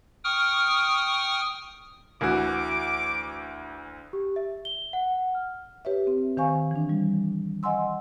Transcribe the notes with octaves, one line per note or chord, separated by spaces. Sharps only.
G5 C#6 D#6 F6
D2 E3 F#4 D6
G4
E5
G7
F#5
F6
G4 B4 C#5 E5
C4
D#3 C5 F5 G#5 C#6
E3 D4
G3
D#5 F#5 G#5 C6 E6